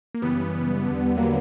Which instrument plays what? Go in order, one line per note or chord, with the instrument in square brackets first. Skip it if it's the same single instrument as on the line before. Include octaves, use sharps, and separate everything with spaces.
[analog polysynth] A#3
F#2 C#3 E3 G3 B3
E2 D3
F#3 A#3